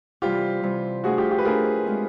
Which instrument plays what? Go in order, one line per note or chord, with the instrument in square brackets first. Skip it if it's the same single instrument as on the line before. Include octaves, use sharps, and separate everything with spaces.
[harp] C3 E3 G3 [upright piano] F4 G4
[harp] C3 E3 G3
[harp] F3 A3 D4 [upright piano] F#4 G#4
[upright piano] F4 G4
F4 G4
B4
[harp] F3 A3 D4 [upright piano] G#4 A#4
[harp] F3 G#3 C4